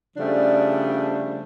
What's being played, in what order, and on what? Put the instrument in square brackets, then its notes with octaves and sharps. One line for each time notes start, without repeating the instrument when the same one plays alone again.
[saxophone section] C#3 F3 G3 A3 D4